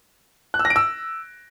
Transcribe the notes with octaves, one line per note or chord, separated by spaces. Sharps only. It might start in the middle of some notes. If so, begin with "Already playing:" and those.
F#6
E6
A#6
D7
E6